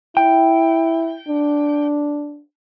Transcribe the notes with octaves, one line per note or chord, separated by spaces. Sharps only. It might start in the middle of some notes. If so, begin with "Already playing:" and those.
E4 G5
D4